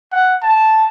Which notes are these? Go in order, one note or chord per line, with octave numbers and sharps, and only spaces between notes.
F#5
A5